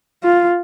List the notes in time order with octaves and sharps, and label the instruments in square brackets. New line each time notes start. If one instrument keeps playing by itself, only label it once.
[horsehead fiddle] F4